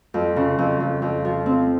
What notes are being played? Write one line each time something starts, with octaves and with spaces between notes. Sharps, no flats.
F2
C#3
F2
F2
F2
F3
C4